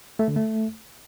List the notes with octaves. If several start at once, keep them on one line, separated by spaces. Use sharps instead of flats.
A3
D3
A3